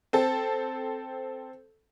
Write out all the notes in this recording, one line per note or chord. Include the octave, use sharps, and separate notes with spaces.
C4 A4